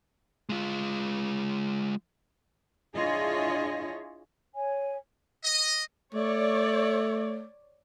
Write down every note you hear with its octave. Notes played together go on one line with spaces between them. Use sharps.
G#3 F4
D4 E4 F4 G#4 C#5 D#5
C#5 G#5
D#5
A3 C#5 D5